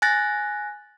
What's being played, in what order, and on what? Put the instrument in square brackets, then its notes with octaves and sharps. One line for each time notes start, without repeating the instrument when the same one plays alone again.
[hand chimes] G#5 F#6 A6 A#6